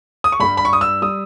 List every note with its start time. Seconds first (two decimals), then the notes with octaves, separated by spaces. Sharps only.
0.24 D#6
0.32 C#6
0.40 G2 G3 B5
0.57 B5
0.65 C#6
0.73 D#6
0.81 E6
1.02 G3 D#6